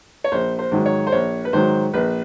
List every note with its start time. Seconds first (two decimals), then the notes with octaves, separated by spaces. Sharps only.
0.24 C#5
0.32 A#1 C5
0.59 C5
0.72 G#2 D#3 F#3
0.86 C#5
1.07 C5
1.12 A#1 C#5
1.45 B4
1.53 G#2 D#3 F#3 C5
1.93 A#1 B4